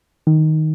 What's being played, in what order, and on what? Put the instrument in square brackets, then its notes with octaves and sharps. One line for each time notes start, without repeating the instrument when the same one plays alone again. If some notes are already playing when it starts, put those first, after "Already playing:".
[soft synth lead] D#3